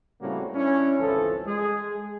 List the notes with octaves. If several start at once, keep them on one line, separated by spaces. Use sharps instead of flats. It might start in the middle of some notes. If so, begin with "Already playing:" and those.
A2 C#3 G3 A#3 C4 F#4
C#4 D4 E4
G#1 C#2 E3 F3 A4
G#3 G#4